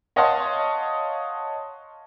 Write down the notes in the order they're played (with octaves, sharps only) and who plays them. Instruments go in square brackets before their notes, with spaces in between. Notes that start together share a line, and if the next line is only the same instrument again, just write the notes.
[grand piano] C#5 D#5 F5 F#5 A5 C6